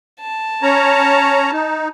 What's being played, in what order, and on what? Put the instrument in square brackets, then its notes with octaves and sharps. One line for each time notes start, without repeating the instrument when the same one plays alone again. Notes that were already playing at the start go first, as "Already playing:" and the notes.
[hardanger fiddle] A5
[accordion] C#4 C#5 A#5
D#4